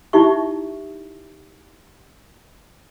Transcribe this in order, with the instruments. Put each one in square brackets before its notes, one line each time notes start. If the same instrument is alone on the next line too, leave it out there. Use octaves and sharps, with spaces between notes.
[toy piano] D#4 E4 G4 E5 C#6